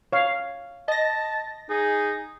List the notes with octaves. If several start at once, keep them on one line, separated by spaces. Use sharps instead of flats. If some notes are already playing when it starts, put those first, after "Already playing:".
C#5 F5
D#5 A5 A#6
D#4 G#4